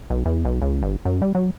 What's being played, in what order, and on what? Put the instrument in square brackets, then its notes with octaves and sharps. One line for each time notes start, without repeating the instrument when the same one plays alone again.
[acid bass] B1
E2
B1
C#2
G1
F#2
G3
F#3